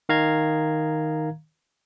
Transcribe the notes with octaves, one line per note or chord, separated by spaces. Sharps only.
D#3 F5 A#5 G#6